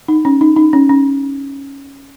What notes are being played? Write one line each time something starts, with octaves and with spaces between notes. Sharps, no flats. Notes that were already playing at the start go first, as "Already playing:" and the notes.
D#4
C#4
D#4
D#4
C#4
C#4